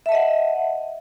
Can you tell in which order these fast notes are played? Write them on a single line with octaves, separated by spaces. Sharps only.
E5 A5 D#5 F#5